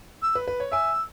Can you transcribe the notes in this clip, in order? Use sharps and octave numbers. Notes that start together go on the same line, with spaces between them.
E6
B4
B4
C#5
E5 G#5 E6